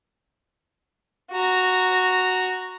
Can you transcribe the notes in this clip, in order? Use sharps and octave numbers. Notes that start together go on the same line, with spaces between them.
F#4 A#5